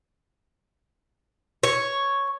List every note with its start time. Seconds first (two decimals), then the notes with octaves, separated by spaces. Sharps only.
1.63 C#5